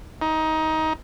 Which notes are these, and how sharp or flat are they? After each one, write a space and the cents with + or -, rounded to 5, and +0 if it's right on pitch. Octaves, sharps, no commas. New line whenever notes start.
D#4 +20